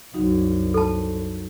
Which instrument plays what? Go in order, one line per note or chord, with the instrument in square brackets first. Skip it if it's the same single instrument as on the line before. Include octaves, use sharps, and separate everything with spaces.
[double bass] C2 F#2 [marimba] F#3 D#4 F#4
[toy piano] A4 A5